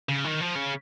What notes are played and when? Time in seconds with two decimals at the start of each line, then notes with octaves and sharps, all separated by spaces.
0.09 C#3
0.24 D#3
0.40 F3
0.55 C#3